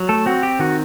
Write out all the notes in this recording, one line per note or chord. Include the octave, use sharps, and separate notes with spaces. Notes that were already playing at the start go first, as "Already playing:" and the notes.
Already playing: F#3
A3 A4
C4 F#4
G4
D#3 F#4